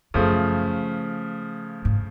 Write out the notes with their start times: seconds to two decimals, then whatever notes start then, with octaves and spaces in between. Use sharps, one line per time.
0.14 F#2 C#3 F3 A3
1.85 G#2